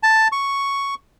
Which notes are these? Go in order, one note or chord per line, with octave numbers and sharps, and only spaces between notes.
A5
C#6